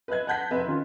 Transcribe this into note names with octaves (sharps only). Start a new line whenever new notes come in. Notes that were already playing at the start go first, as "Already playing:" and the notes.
B4 D#5 E5 F#6 G#6
F#5 A5 F#6 G6 A#6 B6
F1 B4 E5
D#3 C#4 F4